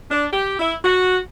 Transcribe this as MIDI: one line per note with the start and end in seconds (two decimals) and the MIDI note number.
0.11 0.26 62
0.32 0.55 67
0.60 0.75 64
0.84 1.19 66